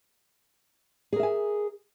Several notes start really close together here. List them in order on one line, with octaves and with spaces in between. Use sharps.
G#4 A#4 E5 G#5